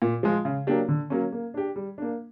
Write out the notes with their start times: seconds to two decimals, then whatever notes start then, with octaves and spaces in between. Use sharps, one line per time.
0.02 A#2
0.23 F3 G#3
0.45 C#3
0.67 F#3 A#3 D4 G4
0.88 D3
1.10 F#3 A#3 C#4
1.32 A#3
1.54 D4 G4
1.76 G3
1.98 A#3 D4